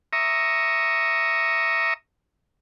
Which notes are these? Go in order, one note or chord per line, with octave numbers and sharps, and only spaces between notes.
E5 A#5 C#6 D#6